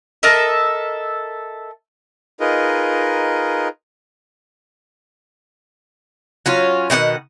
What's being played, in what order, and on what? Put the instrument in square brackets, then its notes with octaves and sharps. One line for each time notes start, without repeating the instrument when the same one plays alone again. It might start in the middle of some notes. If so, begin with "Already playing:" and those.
[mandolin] A4 A#4 D#5 E5
[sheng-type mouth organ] D#4 F4 G#4 A#4 B4 D#5
[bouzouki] F#3 C#4 F4
B2 D#3 F#4 F#5